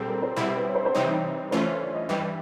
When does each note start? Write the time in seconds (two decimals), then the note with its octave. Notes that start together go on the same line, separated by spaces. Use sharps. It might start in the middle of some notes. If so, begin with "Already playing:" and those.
Already playing: A#2 G3 C4 G#4 A4
0.08 A#4
0.22 C5
0.36 B2 G3 C4 E4
0.56 B4
0.68 C#5
0.75 C5
0.85 C5
0.94 C3 E3 G3 C4 D#4 C#5
1.51 E3 A3 C#4 F4 C5
1.66 C#5
1.81 D5
1.94 D#5
2.09 G2 E3 G3 D#5